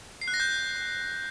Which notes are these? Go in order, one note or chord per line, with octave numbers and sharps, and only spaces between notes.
C7
F#6
A#6
G6